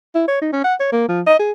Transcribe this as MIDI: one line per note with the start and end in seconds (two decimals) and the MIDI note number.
0.15 0.26 64
0.28 0.37 73
0.41 0.49 63
0.53 0.62 61
0.64 0.75 78
0.80 0.89 73
0.92 1.07 58
1.09 1.21 53
1.27 1.37 75
1.39 1.52 68